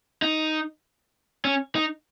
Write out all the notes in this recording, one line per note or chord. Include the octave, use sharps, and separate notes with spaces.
D#4
C#4
D#4